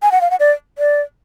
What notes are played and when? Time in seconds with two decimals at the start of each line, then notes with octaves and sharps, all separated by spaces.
0.02 G#5
0.12 F#5
0.21 F5
0.31 F#5
0.40 D5
0.78 D5